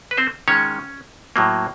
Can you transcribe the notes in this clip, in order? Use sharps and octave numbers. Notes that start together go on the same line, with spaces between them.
B4
C4 C5
D#3 G#3 C#4 C#5
A2 F#3 A#3